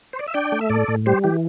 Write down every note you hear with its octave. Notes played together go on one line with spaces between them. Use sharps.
C5
D5
E5
D4 D5 G5
A3
E5
A2 A4 D5
A2
G3 G4 C5
E3 G4